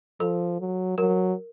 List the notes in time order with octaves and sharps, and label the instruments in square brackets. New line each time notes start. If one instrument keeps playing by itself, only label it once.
[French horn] F3 [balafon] A4
[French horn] F#3
[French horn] F#3 [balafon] A#4